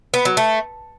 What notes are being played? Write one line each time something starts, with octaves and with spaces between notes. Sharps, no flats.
B3
F#3
A3